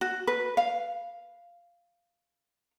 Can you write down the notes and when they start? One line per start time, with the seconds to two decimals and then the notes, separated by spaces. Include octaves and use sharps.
0.01 F#4
0.27 B4
0.57 F5